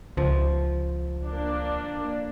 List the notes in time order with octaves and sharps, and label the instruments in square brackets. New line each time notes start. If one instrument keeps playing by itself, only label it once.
[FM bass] C#2 [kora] F3
[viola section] A#3 D4